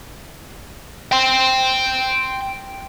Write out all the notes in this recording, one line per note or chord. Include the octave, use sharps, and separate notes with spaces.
G5 C6